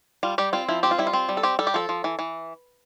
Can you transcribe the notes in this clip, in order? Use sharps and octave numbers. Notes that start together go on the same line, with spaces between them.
G3 F4
G3 G4
C4 F4
F3 E4
C4 G4
F4
G3 E4
F4
C4
G3
A4
C4 G4
G3 A4
G4
F3 A4
F3
E3
E3